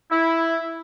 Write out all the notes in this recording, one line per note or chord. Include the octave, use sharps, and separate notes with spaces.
E4